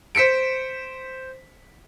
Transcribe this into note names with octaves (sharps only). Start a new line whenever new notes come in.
C5 B6 C#7 D7